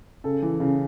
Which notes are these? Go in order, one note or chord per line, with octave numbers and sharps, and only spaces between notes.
C#3 A4
E3
C#3